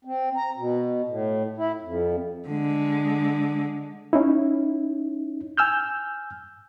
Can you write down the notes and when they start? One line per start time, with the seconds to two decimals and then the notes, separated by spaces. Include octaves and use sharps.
0.05 C4
0.37 A#5
0.57 B2
1.08 A2
1.57 E4
1.82 F2
2.48 D3 G#3
4.13 C#4 D#4 E4
5.58 G#5 E6 F6 G6